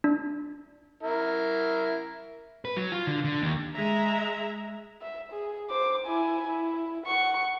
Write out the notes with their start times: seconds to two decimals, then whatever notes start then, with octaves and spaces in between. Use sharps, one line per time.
0.04 D4
1.03 E4 A#4
2.65 B4
2.76 F#3
2.92 F4
3.07 D3
3.25 D3
3.42 D#2
3.73 G#3 E5 A#5
5.02 E5
5.32 G#4
5.70 C5 D6
6.07 E4 G#5
6.47 E4
7.06 F#5 C#6